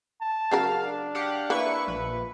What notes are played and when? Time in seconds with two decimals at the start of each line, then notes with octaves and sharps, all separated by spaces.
0.21 A5
0.51 C#3 F#3 A#4 F5
0.83 D4
1.15 G4 F5 F#5
1.50 A#3 E4 B4 C#6
1.87 A#1 B4